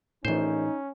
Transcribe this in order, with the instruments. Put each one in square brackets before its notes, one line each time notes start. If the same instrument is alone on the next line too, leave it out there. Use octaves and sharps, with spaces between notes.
[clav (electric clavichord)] A#1 C5 [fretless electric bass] A2 E3 [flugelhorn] C#4 [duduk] D#4